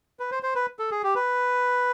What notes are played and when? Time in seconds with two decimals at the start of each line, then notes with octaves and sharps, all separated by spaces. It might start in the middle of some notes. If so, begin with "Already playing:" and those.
0.20 B4
0.31 C5
0.43 C5
0.55 B4
0.79 A4
0.91 G#4
1.03 G4
1.15 B4